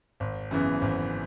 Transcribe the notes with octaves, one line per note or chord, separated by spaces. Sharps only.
G#1
F#2 C#3 E3 B3
G#1